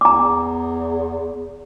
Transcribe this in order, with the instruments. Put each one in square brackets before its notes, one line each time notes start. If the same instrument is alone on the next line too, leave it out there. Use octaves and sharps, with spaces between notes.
[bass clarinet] E2 [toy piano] A#5 D6